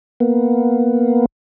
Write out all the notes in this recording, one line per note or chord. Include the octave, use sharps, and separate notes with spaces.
A#3 B3